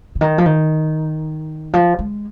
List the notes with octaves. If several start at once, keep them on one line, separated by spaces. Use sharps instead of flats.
C#3
D#3
F3
D#3
F3
G#3